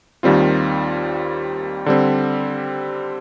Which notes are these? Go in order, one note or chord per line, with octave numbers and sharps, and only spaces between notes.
D#2 D#3 G3 C4 F4
D3 G3 C4